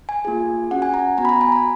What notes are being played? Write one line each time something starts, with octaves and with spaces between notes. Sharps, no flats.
G#5
A#3 F4 G#4
C#4 F#4 F#5
G#5
A#5
B3 F#4 A#5
B5
A#5
G#5
A#5